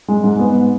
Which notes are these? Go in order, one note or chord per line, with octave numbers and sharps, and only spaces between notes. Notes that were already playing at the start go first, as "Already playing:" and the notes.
G#3
G#2
B3